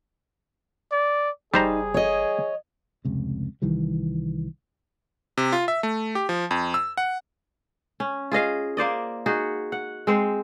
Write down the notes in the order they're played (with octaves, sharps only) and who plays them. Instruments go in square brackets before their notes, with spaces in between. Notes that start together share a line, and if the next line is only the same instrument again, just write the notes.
[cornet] D5
[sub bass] F#1 [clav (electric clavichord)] G3 C5 A#5 [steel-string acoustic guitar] D#4 [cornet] G#4
[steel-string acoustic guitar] C#5 D#5
[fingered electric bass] F1 C#2 C3
C2 D#3 E3 G3
[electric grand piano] C3
F4
E5
A3
G4
F3
F2
E6
F#5
[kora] C#4
F4 G#4 D#5 F5
A#3 C5 D5 D#5
D#4 F#4 G#4
F#5
G#3 C4 C5